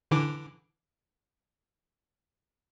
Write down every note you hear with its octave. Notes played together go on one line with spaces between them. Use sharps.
D3 E3 D6